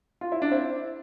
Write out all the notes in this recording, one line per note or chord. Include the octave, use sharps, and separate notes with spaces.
F4
E4
D4
C4 E4